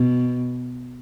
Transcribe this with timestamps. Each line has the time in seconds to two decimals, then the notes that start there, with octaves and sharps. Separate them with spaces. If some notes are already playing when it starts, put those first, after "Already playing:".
Already playing: B2